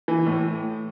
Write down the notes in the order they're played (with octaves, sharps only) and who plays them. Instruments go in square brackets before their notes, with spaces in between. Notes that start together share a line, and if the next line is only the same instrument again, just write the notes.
[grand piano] E3
A2